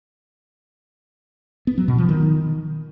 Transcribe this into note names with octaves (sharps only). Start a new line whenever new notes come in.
B3
F#3
B2
F3
D#3